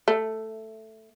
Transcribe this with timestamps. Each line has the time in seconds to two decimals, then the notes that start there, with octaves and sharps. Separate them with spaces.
0.08 A3